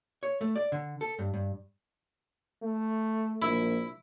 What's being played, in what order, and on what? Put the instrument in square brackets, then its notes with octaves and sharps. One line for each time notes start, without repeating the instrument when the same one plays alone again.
[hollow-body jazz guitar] C#5
A3
D5
D3
A4
G2
G2
[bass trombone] A3
[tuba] A#1 [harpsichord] E4